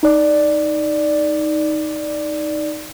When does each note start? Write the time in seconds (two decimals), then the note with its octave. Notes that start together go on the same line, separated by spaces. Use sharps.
0.03 D#4 D5